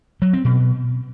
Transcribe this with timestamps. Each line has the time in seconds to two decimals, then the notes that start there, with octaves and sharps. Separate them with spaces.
0.22 F#3
0.33 C4
0.45 B2